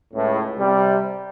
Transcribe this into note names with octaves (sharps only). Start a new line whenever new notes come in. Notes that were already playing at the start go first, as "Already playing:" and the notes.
C#2 A2
C3 G3